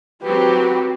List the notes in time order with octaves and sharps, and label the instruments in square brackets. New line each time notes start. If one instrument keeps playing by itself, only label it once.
[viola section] F#3 C4 [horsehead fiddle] F#4 B4 [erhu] G4